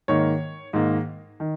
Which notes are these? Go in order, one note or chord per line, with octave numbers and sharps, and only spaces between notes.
G#2 D#3 A#3 C#5
G#2 D#3 A#3
D#3